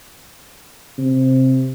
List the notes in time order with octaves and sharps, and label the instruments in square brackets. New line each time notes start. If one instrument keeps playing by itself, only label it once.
[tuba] C3